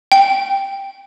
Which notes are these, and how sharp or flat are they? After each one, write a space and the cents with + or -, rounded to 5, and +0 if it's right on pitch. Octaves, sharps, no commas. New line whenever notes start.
G5 +5